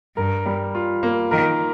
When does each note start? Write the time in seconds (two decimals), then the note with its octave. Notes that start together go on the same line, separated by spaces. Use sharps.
0.16 G2 A#4
0.46 G3
0.75 F4
1.03 A#3
1.31 D#3 A#4